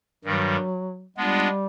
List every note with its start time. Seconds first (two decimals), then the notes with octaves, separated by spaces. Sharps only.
0.24 G2 D#3 F#3 G3
1.17 G3 G#3 B3 D4 F4